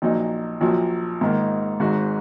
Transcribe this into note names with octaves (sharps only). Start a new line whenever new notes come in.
A#1 A#2 F#3 D#4
A#1 A#2 F#3
G#2 D#3 A#3
G#1 G#2 G#3 F#4